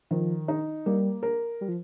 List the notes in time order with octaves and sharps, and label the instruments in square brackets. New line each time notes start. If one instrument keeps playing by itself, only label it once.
[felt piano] D#3 [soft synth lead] F3
[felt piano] D#4
[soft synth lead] G3 [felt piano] A#3
[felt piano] A#4
[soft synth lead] G3
F3